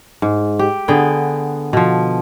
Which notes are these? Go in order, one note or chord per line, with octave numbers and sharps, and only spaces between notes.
G#2
G4
D3 B3 G#4 G5
B2 F3